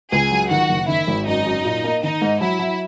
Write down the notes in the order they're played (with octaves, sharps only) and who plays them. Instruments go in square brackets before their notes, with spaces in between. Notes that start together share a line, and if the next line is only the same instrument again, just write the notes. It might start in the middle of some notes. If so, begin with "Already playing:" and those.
[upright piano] C#2 [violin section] G#4 G#5
[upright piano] F#3
[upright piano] D#3 [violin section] F#4 F#5
[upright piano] F#1
[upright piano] D#3 [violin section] E4 E5
[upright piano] G#1
[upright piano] F#2 [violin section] D#4 D#5
[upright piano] F#2
A#2
A#3
[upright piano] D#3 [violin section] D#4 D#5
[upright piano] G#2
[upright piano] F#3 [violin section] E4 E5
[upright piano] F#3